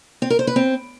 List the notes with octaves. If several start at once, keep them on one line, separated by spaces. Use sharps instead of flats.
C4
A#4
C5
B4
C4